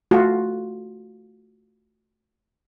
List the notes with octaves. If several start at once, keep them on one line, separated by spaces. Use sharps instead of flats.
A3 F4 F#4